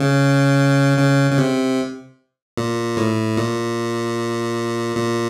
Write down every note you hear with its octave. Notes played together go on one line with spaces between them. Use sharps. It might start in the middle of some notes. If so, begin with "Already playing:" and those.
Already playing: C#3
C#3
C#3
C3
A#2
A2
A#2
A#2